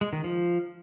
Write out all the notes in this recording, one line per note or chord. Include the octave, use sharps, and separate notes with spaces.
G#3
D#3
F3